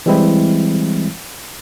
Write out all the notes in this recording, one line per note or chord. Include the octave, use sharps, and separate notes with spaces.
E3 G3 G#3 C4 E4